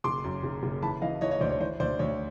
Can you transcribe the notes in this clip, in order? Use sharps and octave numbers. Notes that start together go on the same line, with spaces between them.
F#1 C6 D6
F#2
F#1
F#1
E3 A5 B5
E3 D#5 F5
E3 C#5 D#5
C#5 D#5
D2 C5 D5
C#5
E3 C5
D2 C5 D5
D2 C#5